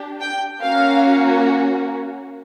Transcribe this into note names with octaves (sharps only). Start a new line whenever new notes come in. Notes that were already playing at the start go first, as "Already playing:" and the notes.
Already playing: D4 G4
G5
A#3 C#4 F#4 F5